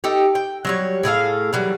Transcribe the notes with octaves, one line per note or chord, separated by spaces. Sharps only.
D#4 G4 A4
G5
F#3 G3 C#5
A2 G#4 A4 F5
E3 F#3 G3